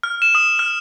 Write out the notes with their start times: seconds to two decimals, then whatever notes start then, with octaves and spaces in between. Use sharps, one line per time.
0.03 F6
0.22 E7
0.35 D#6
0.59 F6